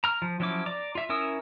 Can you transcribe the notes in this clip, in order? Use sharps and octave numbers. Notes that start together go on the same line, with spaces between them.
A#5 F6
F3
F3 F#3 C#4 E4 D6
D5 A#5 D6
F4 E5
C#4 E4 A#4 D#6 E6